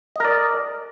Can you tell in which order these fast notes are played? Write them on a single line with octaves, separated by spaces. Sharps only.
D#5 A#4 D5